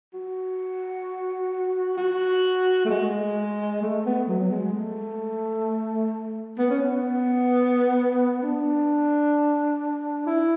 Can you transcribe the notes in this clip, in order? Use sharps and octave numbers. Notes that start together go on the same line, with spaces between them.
F#4
F#4
A3
G#3
A3
B3
F#3
G#3
A3
B3
C#4
B3
D4
E4